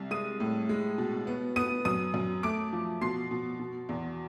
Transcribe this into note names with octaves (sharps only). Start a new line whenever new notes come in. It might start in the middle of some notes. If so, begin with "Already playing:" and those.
Already playing: C2
G#3 D#6 D#7
A2
G#3
B2
B3
B3 D#6 D#7
F#2 D#6 D#7
F#2
A3 D6 D7
F3
B2 C6 C7
B2
B2
E2